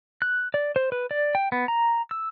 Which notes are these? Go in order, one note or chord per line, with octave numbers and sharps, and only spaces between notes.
F#6
D5
C5
B4
D5
G5
B3
A#5
E6